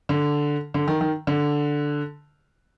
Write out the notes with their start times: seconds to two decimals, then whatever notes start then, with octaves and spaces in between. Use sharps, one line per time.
0.09 D3
0.74 D3
0.88 D#3
1.01 D#3
1.27 D3